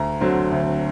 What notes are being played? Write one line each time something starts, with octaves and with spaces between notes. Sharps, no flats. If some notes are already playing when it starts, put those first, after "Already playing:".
Already playing: D2 A#5
D3 F#3 C4
D2